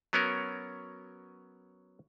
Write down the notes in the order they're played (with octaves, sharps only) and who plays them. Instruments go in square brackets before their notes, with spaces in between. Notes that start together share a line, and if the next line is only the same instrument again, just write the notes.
[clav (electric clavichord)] F#3 B3 C#4 A#4